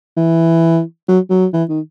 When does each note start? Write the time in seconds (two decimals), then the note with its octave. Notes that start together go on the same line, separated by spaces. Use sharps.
0.17 E3
1.08 F#3
1.30 F#3
1.53 E3
1.69 D#3